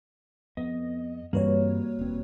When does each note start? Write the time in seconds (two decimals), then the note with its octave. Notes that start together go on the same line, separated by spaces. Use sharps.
0.57 F2 B3 D#5
1.33 G2 E3 G3 A#3 C4 F#4 B4 C#5
1.99 E1 C4